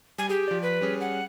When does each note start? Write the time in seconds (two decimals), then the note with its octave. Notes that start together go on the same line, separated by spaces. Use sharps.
0.18 G3 G#5
0.30 G4 G#4
0.48 F3 D5
0.62 B4
0.81 G3 C#4 G#4
1.01 F#5